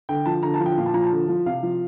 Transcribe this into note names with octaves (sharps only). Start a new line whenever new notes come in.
D3 G5
F3 A5
D3 A#5
A5
F3
G5
A#2 F5
A5
F3 A#5
A5
D3
F3
C3 F5
F3